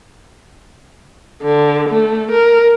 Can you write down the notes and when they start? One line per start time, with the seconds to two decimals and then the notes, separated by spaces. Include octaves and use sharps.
1.42 D3
1.89 A3
2.31 A#4